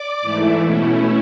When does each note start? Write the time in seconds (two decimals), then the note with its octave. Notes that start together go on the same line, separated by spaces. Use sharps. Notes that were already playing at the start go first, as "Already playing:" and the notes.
Already playing: D5 D6
0.21 G#2 E3 A3 E4
0.64 B2 A3 C#4 E4